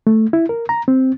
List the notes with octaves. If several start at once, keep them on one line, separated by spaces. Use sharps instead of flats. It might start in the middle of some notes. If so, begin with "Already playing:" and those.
A3
E4
A#4
A#5
C4